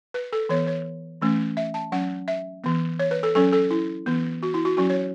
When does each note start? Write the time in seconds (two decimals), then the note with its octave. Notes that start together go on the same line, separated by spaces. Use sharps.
0.14 B4
0.33 A4
0.49 E3 B3 C#5
0.67 C#5
1.21 E3 A3 C#4
1.57 E5
1.74 A5
1.92 F#3 C#4 F#5
2.28 E5
2.64 E3 B3
2.99 C#5
3.11 B4
3.23 A4
3.35 F#3 C#4 A4
3.53 A4
3.71 E4
4.06 E3 B3
4.43 F#4
4.54 E4
4.65 F#4
4.77 F#3 C#4 F#4
4.90 C#5